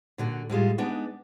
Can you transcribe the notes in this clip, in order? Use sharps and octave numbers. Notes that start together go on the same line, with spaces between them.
A#2 D3 F#4
A2 G3 G#3 F4
G#3 B3 D4 D#4